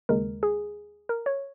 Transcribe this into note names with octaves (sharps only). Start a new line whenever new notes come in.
D#2 C#3 G#3 A#4
G#4
A#4
C#5